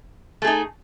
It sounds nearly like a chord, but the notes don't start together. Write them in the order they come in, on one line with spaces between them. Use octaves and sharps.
A3 G#4 D#4